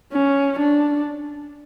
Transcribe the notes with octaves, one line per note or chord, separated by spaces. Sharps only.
C#4
D4